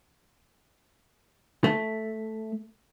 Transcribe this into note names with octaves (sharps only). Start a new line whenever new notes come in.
A3